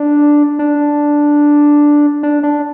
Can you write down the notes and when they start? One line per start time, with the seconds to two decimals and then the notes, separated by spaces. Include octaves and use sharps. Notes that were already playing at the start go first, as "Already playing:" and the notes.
Already playing: D4
0.59 D4
2.23 D4
2.43 D4